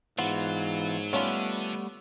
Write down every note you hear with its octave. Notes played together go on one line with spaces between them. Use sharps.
G#2 E3 F#3 B3 F4 F#5
D3 G3 A3 B3 C#4 D4 F4